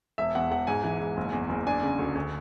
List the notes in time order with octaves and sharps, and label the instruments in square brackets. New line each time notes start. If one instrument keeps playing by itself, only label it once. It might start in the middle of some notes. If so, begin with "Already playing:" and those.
[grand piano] E1 E5
E2 F#5
E1 F#5
G#2 G#5
E3
G#2
F#1
E2
F#1
D4 G#5
C#3
D2
D2